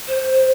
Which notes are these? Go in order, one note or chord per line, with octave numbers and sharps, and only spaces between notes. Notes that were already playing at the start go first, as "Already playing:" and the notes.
C5